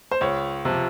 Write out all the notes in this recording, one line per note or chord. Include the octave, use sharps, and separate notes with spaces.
C5
C#2 C#5
C3 F3